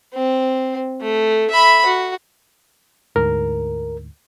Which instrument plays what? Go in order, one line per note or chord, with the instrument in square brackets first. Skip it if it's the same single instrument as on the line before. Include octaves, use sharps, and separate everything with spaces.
[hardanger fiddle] C4
A3
E5 B5
F#4
[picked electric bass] D2 G#2 [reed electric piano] A#4